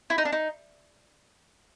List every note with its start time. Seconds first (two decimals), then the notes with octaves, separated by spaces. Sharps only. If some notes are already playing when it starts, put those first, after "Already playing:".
0.10 E4
0.18 D#4
0.25 D4
0.32 D#4